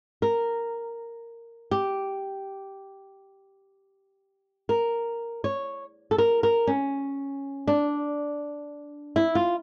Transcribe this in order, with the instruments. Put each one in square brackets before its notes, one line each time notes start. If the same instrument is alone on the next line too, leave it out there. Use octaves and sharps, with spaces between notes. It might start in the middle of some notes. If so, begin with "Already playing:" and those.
[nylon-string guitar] A#4
G4
A#4
C#5
A4
A#4
A#4
C#4
D4
E4
F4